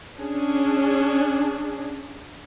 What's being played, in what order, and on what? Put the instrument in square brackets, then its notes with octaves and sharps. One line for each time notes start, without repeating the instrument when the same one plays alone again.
[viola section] C#4 D4 G#4